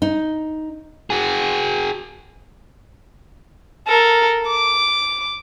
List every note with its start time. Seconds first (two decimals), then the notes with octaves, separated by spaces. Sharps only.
0.02 D#4
1.10 F#4 G#4
3.87 A4 A#4
4.47 D6